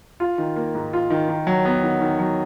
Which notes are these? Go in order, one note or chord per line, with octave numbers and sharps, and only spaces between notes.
F4
D#3
A#3
G#2
F4
D#3
D#3
F#3
B3
D#3
D#3
F#3